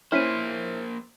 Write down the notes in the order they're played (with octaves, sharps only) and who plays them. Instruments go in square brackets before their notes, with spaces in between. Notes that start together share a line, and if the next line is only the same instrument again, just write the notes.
[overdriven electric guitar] A#3 C5 [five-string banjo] C#4 E4 [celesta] F6 B6 D#7